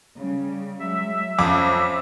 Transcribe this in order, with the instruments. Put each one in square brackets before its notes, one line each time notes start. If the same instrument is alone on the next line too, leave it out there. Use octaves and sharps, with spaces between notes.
[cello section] C#3 G3
[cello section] F#3 G#3 [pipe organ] E5
[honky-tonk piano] F2 D6 [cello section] C#4 C5